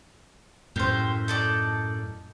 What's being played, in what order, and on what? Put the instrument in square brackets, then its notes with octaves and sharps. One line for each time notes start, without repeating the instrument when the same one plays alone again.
[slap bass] F#2 A2 [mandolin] G4 C5
[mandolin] D#4 A4 D5